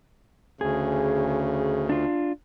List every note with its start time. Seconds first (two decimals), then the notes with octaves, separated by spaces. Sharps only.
0.61 D2 C#3 G#4
1.89 D4 F4